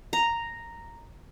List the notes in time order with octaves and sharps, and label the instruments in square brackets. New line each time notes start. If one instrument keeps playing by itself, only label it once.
[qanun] A#5